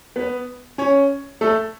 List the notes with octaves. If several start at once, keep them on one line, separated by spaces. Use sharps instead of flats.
B3 B4
C#4 C#5
A3 A4